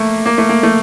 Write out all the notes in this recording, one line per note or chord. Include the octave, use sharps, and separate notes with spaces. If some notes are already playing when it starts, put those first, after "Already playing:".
Already playing: A3 A#3
A#3
A3
A#3
A3